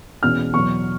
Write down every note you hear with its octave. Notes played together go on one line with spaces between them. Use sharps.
E2 B2 G#3 C#4 F6
E2 B2 F#3 C#6